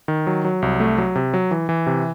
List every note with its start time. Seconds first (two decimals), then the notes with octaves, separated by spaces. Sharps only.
0.08 D#3
0.27 F#3
0.45 F#3
0.62 C2
0.80 A3
0.98 F#3
1.15 C3
1.34 F#3
1.51 E3
1.69 E3
1.87 C3